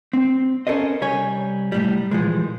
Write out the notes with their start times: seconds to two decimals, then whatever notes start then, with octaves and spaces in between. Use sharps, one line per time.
0.13 C4
0.67 C#4 A4 A#4 C5 D#5
1.01 C2 G3 C#5 G#5
1.72 C2 A2 G3
2.11 A#2 E3 F3 G#3